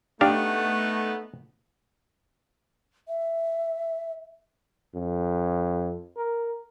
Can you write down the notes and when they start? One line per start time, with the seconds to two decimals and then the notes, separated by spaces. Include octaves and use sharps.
0.21 A3 B3 D4 D#4 G4 F5
3.08 E5
4.95 F2
6.17 A#4